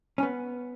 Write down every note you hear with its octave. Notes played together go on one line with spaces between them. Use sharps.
C#4
B3